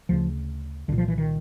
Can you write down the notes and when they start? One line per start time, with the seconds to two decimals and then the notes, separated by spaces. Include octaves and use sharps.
0.09 D2 C#3 F3
0.88 C2 A#2 D3
0.98 F3
1.08 E3
1.18 D#3